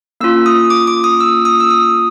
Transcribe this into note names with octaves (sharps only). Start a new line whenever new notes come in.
A#3 C#4 F4 E6
D#6
D6
D6
D#6
E6
D#6
E6
D#6